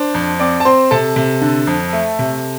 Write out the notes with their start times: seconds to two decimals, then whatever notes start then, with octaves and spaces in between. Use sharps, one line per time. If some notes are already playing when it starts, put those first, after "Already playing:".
Already playing: D4 C5
0.14 F2
0.40 C4 D5 D6
0.60 A5
0.65 C4 C5 C6
0.91 C3 A4 A5
1.16 C3
1.41 D3
1.67 F2
1.93 A3
2.19 C3